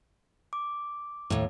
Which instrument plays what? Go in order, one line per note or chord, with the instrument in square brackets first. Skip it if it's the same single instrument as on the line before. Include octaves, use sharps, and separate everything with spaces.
[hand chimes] D6
[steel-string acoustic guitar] D#2 A2